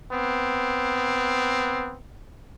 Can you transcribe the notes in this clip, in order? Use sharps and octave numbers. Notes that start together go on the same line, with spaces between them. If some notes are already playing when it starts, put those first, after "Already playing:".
B3 C4